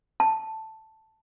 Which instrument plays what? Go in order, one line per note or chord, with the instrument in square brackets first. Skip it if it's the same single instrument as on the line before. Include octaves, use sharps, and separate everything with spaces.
[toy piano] A5